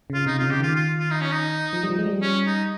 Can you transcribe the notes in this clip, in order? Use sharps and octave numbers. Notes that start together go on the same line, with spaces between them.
C#3 F4
C3 D#4
C#3 F4
G4
D#3 F4
F4
F4
D#4
C#4
D#4
F3
G3
F3
G#3
G3
C#4
D#4